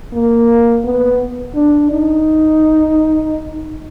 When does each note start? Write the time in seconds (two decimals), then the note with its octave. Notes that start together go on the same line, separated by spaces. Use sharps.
0.13 A#3
0.84 B3
1.55 D4
1.91 D#4